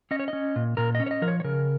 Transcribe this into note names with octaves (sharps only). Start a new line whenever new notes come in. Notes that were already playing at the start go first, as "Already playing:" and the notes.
C#4 D#5
C#5
D#5
C#4
A#2
A#2 A#4
D#5
C#4
C#5
D#5
F3 A#4
C#5
C#5
C#3 A#4